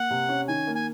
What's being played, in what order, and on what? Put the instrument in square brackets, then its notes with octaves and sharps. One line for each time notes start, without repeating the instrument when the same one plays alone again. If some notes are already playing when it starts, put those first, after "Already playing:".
Already playing: [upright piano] A#3 [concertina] F#5
[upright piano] C3
C#4
[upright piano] D#3 [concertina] G#5
[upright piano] A#3
[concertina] G#5